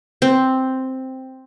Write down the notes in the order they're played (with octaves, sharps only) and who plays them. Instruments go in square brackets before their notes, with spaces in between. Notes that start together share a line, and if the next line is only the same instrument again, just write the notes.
[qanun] C4